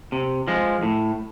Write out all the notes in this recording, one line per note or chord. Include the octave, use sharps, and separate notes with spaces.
C3
F3 G#3
A2